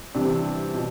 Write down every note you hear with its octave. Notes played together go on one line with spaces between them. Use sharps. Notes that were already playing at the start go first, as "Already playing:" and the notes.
C3 E3 G3 D4
B2